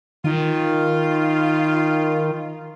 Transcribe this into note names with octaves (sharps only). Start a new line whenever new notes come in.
D#3 F4